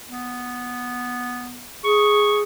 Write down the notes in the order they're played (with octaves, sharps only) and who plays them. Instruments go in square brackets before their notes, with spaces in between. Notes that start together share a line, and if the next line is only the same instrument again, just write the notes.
[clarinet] B3
[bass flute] G#4 [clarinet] C#6